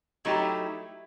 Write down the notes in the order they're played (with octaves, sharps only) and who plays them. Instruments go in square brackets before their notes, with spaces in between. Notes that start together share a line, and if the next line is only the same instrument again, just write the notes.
[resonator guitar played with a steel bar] F#3 A3 D#4 G4 [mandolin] E4